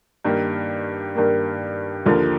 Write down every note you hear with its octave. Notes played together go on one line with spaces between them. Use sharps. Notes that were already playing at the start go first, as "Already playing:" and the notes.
G2 D#3 A#3
G2 D#3 A#3
D#2 D3 F3 A#3